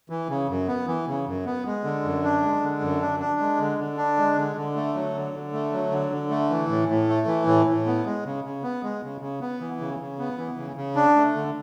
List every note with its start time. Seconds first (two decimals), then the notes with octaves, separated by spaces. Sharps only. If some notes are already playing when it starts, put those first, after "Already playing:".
0.10 E3
0.29 C#3
0.49 F#2
0.68 B3
0.87 E3
1.07 C#3
1.27 F#2
1.45 B3
1.66 G#3
1.84 D3
2.04 F#2
2.24 D4
2.42 G#3
2.62 D3
2.81 F#2
3.01 D4
3.20 D4
3.40 G#3
3.59 D3
3.79 D3
3.97 D4
4.17 G#3
4.36 D3
4.57 D3
4.76 A3
4.94 F#3
5.14 D3
5.34 D3
5.53 A3
5.72 F#3
5.91 D3
6.11 D3
6.30 A3
6.50 E3
6.69 A2
6.89 A2
7.09 A3
7.27 E3
7.46 A2
7.67 A2
7.86 B3
8.05 G#3
8.25 C#3
8.44 C#3
8.63 B3
8.83 G#3
9.03 C#3
9.21 C#3
9.40 B3
9.60 E3
9.80 C#3
10.00 C#3
10.19 B3
10.38 E3
10.58 C#3
10.76 C#3
10.95 D4
11.16 A3
11.35 D3